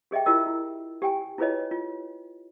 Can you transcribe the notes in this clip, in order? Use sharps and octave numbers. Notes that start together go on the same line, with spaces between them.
G4 G#4 D#5 E5 G5
E4 F4 G4 A#4 D#5 E6
E4
G4 G5 G#5
E4 F4 G#4 B4 C#5 D#5
F4